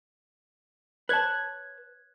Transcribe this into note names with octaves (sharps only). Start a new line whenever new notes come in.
B4 C#5 A5 F#6 G#6